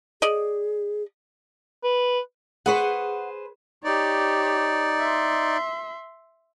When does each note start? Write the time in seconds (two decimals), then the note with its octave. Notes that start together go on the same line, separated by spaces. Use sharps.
0.22 G#4 D5 D#5
1.84 B4
2.66 G#4 B4 C5 F#5 C#6
3.84 D#4 G4 C#5 D5
5.00 E5 C6